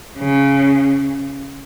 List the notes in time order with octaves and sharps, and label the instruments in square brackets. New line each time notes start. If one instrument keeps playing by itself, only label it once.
[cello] C#3